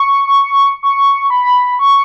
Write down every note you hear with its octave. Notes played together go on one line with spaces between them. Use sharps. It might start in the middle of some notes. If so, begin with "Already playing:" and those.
Already playing: C#6
C#6
B5
C#6